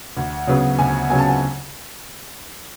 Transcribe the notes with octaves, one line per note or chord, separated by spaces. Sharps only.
D2
C#3 F#3 B3
D2 G#5
C#3 F#3 B3 G#5
A5
G#5